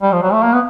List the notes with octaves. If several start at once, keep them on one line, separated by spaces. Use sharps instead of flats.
G3
F3
F#3
A3
A#3
B3